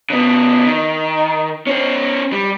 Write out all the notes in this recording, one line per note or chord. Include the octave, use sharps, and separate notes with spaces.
C#3 B3
D#3
C#4 C5
G3